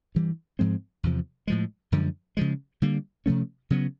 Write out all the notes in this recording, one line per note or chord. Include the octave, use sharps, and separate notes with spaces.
G2 E3 G3
G#2 F3 G#3 C4
E2 C3 F3
A2 F3 G#3
F#2 D3 F3 G#3
C#3 F3 G#3
D3 G3 A#3
C3 F3 A3 C#4
C#3 F#3 B3